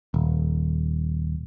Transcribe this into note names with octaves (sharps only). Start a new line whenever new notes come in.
D#1